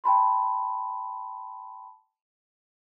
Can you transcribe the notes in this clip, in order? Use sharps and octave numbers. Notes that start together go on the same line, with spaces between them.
G5 A5 B5 C6